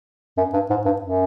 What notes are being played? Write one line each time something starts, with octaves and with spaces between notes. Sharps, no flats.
F#2
G2
G#2
G2
F#2